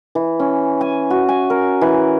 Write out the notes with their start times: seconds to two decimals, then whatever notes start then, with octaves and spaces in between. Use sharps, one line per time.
0.15 E3
0.40 C#4
0.81 G#5
1.11 F#4
1.29 G#5
1.50 A#4
1.81 E3